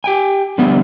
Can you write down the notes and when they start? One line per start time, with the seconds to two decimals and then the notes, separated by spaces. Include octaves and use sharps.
0.04 G4 G5 G#5
0.58 D3 F3 G3 B3